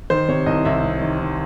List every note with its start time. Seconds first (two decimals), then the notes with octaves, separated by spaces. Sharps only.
0.10 D#3 C5
0.29 C3 C#5
0.46 C2 D#5
0.65 C2 E5
0.83 C3
1.01 D#3
1.19 D#3